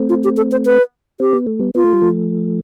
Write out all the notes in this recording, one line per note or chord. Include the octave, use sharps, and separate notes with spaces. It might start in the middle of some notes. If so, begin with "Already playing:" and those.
Already playing: A3 C4
F4
G4
A4
C5
B4
C4 G4
B3
A3
G3 B3
B3 F4
A3
G3
F3 A3